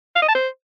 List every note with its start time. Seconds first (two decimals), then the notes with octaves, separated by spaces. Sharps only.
0.16 F5
0.22 D#5
0.29 A5
0.35 C5